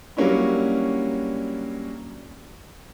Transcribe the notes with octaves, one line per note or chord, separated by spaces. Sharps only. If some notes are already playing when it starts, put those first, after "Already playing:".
F#3 G3 A#3 C#4 D4 E4